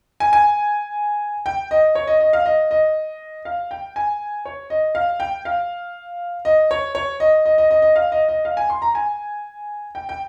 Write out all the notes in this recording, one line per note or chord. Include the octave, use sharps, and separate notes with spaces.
G#5
G#5
G5
D#5
C#5
D#5
D#5
F5
D#5
D#5
F5
G5
G#5
C#5
D#5
F5
G5
F5
D#5
C#5
C#5
D#5
D#5
D#5
D#5
D#5
F5
D#5
D#5
F5
G#5
C6
A#5
G#5
G5
G5